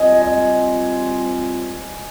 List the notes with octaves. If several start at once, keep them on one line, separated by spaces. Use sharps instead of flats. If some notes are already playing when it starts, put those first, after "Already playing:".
Already playing: G3 C4 F4 D#5 G#5
D#5